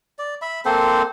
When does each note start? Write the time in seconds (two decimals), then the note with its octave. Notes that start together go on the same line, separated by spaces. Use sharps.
0.19 D5
0.42 E5 B5
0.65 A#3 C4 A4 C5